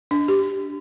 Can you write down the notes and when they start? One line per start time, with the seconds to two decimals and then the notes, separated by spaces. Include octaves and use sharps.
0.11 D4
0.28 G4